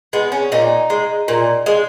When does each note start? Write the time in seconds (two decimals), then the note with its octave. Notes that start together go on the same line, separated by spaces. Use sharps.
0.13 G#3 B3
0.32 C#4
0.52 A#2 D#4
0.90 G#3
1.28 A#2
1.66 G#3